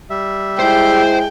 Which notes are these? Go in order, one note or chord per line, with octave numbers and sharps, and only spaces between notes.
G3 E5
G#3 E4 G#4 C5 G5 C6